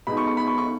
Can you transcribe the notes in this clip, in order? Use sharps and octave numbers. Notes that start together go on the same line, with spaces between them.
B2 G#3 B3 D#4 B5
C#6
C#6
B5
C#6
C#6